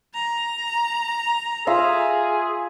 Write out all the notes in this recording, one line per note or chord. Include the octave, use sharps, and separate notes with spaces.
A#5
F4 G#4 E5 F5